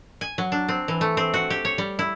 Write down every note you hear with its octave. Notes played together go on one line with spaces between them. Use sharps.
G#5
F#3
D4
C4
E3
A3
C4
F#4
G4
C#5
G3
E4